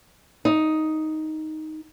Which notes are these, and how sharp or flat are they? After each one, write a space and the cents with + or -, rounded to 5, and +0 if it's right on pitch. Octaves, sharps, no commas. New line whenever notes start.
D#4 +5